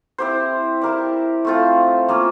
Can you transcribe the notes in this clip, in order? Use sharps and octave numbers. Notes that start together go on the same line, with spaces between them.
C4 E4 G4 C5
E4 G4 A#4 D5
A3 C4 F4 A4
F3 A#3 C#4